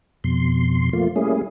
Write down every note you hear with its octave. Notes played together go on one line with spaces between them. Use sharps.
F2 B2 C6
F3 A3 A#3 F4
G3 A3 A#3 C#4 E4 G#4